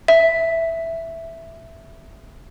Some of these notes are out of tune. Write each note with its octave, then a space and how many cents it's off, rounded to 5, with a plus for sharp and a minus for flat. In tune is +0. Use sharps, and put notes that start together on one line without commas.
E5 +0